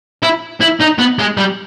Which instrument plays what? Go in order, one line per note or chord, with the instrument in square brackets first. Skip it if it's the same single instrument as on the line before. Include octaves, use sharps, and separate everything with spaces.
[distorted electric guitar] E4
E4
D#4
B3
G#3
G3